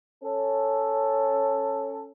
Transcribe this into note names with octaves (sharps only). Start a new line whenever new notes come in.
C#4 A4